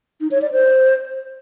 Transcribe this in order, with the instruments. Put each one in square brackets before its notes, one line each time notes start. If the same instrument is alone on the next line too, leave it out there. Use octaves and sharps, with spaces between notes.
[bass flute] D#4
C#5
D5
C5